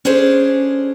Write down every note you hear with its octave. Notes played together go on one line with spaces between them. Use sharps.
C#4 D4 G#4 A4 C5 C#5